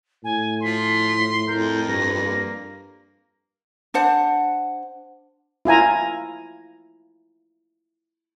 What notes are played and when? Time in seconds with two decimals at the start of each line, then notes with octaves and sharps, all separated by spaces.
0.24 A2 G#5
0.63 F3 C6 B6
1.48 F2 A#4 G6
1.88 G2 A#6
2.23 A#3
3.94 D4 C5 F#5
5.65 E4 F4 G#5 A#5